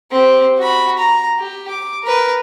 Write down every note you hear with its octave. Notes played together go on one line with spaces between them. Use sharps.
C4 G4
F#4 B5
A#5
G4
D6
A#4 B4